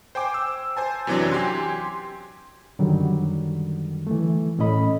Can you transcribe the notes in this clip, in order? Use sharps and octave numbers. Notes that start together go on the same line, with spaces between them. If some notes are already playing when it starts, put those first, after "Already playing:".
C5 G5 G#5 D6
E6
C5 G#5 A5
F#2 C3 E3 F#3 D4
G4 G#5 C6 G#6
F#2 D3 D#3 F#3 G3
E3 A3
A2 C#4 A4 D#5 B5